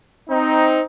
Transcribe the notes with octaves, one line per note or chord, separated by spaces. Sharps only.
C4 D#4